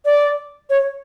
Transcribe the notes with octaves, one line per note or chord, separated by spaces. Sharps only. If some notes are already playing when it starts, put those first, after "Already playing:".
D5
C#5